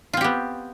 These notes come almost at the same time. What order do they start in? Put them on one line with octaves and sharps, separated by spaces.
F4 C4 G4 B3